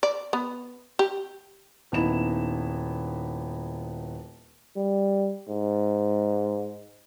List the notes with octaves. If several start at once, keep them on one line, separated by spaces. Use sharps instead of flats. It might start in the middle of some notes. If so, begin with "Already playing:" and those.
D5
B3
G4
D#1 B3 D#4 E4 E7
G3
G#2